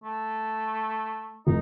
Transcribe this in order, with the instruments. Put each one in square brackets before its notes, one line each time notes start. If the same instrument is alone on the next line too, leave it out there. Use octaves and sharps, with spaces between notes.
[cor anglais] A3
[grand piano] F1 [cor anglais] D#4